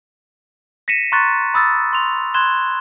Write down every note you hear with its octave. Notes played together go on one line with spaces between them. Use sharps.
A#6 B6 C#7 D#7 E7
A#5 C6 C#6 F#6 A6
B5 D#6 E6 A6
C6 F7
C6 F#6 G#6 E7 G7